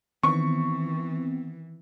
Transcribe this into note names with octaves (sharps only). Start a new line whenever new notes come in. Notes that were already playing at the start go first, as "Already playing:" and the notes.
D#3 E3 B3 C4 C#6